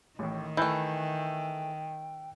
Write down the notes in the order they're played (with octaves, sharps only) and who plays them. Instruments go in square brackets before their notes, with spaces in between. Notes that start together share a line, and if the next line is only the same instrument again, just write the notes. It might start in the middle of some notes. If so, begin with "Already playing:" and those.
[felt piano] A1 A2 [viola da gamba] D#3
[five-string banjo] E3 A3 [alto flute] G5 [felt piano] E6 F#6 G6